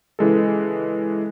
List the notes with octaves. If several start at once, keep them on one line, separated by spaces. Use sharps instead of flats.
C#3 E3 G#3 A4